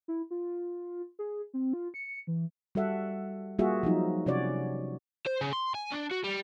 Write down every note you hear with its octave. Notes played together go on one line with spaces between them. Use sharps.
E4
F4
G#4
C4
F4
C#7
E3
G3 F#4 A4 E5 F#5
G3 A#3 F4 F#4 G#4 E5
F3 F#3 D#4
C3 C#4 F#4 C#5 D5
C5
C#3
C6
G#5
D4
F#4
G3